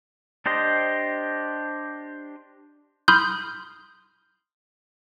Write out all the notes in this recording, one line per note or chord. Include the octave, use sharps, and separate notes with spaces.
D4 G4 C5 D#5
B5 C6 D#6 F6 G6